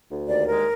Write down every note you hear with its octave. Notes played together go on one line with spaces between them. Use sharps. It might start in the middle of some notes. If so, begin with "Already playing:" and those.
D2
D#2 D5
G#3 A#4